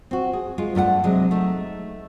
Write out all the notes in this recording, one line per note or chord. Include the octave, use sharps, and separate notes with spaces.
C4 F#4
G#4
G#3 F4
G2 A3 A4 F#5
C3 F#3 G#3
A3 D#4